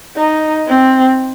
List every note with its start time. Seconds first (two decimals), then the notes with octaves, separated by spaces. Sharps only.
0.16 D#4
0.67 C4